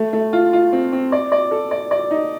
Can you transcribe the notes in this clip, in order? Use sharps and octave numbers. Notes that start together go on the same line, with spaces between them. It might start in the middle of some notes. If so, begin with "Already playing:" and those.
Already playing: A3
A3
F4
F4
C4
C4
D5
D5
A4
D5
D5
D#4